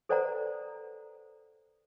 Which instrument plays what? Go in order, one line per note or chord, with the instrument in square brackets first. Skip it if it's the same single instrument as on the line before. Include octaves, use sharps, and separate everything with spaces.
[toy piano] A4 B4 C5 D5 F#5 A#5